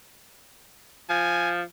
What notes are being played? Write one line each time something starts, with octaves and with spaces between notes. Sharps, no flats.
F3 G#5